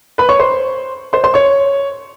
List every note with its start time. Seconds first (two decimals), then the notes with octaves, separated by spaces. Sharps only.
0.18 B4 B5
0.29 C#5 C#6
0.39 C5 C6
1.13 C5 C6
1.24 C5 C6
1.34 C#5 C#6